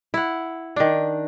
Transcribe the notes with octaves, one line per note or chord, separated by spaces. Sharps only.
E4 F#5
D#3 D4